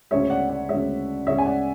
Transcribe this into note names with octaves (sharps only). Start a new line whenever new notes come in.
D2 C#3 G#3 C#5 E5
D5 F#5
D5 F#5
D2 C#3 G#3 C#5 E5
D2 C#3 G#3 C#5 E5
G#5
D5 F#5